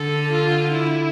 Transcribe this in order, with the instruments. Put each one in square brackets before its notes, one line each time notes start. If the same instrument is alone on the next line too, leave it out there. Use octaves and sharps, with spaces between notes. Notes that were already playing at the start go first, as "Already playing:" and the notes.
Already playing: [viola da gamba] D3 [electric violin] A4
[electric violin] F4
E4